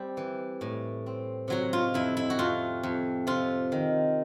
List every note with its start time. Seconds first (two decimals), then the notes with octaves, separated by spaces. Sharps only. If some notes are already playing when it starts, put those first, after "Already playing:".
Already playing: G3 C4 G4
0.17 E3
0.61 A2
1.06 C4
1.48 C3 F#3 F#4
1.73 F4
1.94 F2 E4
2.17 E4
2.30 F#4
2.39 F2 F4
2.83 F2
3.27 C3 F4
3.72 D#3